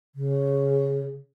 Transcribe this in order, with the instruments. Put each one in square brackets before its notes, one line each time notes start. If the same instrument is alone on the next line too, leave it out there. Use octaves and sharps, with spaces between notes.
[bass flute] C#3